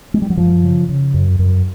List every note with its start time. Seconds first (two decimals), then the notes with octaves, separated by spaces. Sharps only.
0.14 G#3
0.22 G3
0.30 F#3
0.37 F#2 F3
0.63 C#3
0.89 C#3
1.14 F#2
1.39 F#2